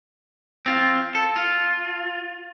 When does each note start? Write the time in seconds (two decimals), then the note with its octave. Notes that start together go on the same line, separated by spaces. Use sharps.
0.66 C4 F4
1.15 A4
1.36 F4